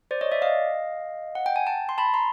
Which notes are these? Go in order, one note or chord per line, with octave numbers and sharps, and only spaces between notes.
C5 D5
C#5 D#5
D5 E5
D#5 F5
F#5
G5
G#5
G5 A5
C6
A5 B5
A#5 C6